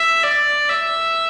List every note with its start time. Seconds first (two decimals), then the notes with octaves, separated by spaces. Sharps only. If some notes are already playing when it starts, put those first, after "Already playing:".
Already playing: E5
0.23 D5
0.69 E5